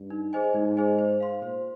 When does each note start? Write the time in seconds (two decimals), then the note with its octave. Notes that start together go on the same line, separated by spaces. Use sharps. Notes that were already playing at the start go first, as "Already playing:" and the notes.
Already playing: G2
0.10 D#4
0.33 G#4 C5 D#5 G#5
0.54 G#2 D#4
0.77 G#4 C5 D#5 G#5
0.99 C5
1.20 F5 C6
1.42 A#2 C5